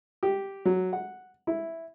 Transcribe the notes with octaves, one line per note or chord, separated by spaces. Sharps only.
G4
F#3
F#5
E4